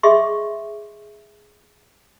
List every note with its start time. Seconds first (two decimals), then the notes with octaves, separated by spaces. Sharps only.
0.03 G#4 D#5 E5 C6 C#6